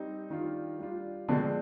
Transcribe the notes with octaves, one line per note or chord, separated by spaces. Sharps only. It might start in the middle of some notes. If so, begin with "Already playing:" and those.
Already playing: G3 C4 D#4
D#3 G3 D4 F4
G3 D4 F4
B2 D3 F3 G#3 C4